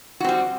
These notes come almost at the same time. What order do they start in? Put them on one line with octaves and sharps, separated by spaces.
F#4 C4 G3